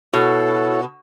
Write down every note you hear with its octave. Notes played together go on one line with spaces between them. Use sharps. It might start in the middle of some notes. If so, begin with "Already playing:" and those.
B2 E4 F#4 A4 C#5